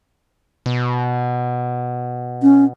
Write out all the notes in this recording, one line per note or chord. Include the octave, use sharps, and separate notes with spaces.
B2
C#4